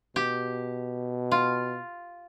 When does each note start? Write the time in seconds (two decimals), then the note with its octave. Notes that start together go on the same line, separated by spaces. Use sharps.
0.16 B2 G4
1.31 F4